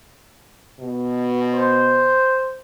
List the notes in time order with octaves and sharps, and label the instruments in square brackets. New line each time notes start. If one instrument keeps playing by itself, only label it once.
[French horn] B2
[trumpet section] C5